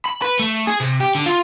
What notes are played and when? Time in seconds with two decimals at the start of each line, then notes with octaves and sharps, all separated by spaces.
0.06 B5
0.22 B4
0.39 A3
0.67 G#4
0.80 C3
1.01 G4
1.15 D3
1.26 F4